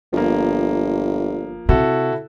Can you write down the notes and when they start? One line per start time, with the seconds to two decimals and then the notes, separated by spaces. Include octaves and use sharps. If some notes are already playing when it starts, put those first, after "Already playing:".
0.13 G1 F3 A#3
1.69 C3 E4 F#4 A4